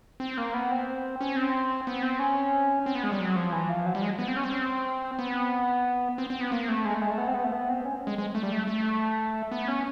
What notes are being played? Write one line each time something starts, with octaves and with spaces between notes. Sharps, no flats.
C4
A#3
B3
C4
C#4
C4
B3
C4
C#4
C4
B3
G#3
G3
F#3
F3
E3
F3
F#3
G3
G#3
B3
C4
C#4
C4
B3
C4
C4
B3
A#3
A3
G#3
A3
G#3
A3
B3
C4
B3
A3
B3
C4
C#4
G#3
G#3
A3
G3
A3
A3
B3
C#4